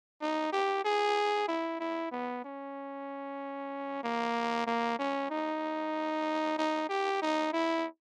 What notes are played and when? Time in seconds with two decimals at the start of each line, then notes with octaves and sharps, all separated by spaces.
0.22 D#4
0.53 G4
0.85 G#4
1.48 E4
1.80 E4
2.12 B3
2.45 C#4
4.04 A#3
4.67 A#3
4.99 C#4
5.30 D#4
6.58 D#4
6.89 G4
7.22 D#4
7.53 E4